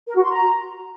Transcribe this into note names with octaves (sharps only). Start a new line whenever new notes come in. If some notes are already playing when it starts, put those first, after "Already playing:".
A#4
F#4
C6
A#5